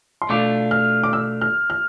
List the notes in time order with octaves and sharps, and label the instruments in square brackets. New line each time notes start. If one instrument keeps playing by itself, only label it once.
[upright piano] C6
[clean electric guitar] B2 A3 D4 F4 [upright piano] D6
[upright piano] F6
D6
E6
F6
F6